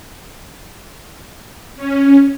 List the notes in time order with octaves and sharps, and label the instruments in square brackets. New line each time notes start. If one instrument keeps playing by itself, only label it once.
[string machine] C#4